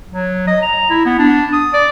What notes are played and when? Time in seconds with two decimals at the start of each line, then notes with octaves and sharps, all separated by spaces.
0.09 F#3
0.47 D#5
0.62 A#5
0.90 E4
1.05 B3
1.18 D4
1.53 D#6
1.73 D5